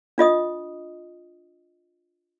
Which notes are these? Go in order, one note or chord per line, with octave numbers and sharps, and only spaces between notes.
D4 F4 D#5 D#6